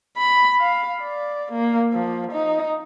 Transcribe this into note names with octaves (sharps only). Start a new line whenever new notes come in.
B5
F5
D5
A#3
F3
D#4